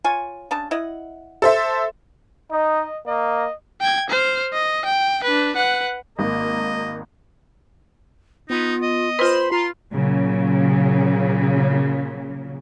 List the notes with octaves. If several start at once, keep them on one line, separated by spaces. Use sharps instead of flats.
F4 C#5 G#5
C#3 D4 A5
E4 D#5 F#5
A4 C5 E5
D#4 D#5
A#3 D#5
G5 G#6
C5 F6
D#5
G5
D4 B4
B4 F#5
G#1 A#3 D#5
B3 D#4 F4
D#5
F4 B4 C5 B5 C6
F4 A#5 C6
A#2 C#3 F#3